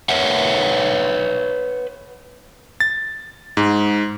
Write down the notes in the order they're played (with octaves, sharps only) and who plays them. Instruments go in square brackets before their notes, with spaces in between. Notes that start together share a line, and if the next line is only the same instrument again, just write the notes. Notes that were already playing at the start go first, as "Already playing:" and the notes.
[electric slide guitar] B4 C#5 E5 F#5
[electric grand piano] A6
G#2